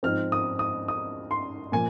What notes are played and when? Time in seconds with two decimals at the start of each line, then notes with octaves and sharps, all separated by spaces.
0.03 G#2 F3 C4 F6
0.32 D#6
0.59 D#6
0.88 D#6
1.31 C6
1.72 A#2 F3 G#5